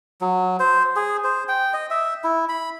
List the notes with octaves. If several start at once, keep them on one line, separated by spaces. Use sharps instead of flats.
F#3
C5
G#4
C5
G5
D#5
E5
E4
B5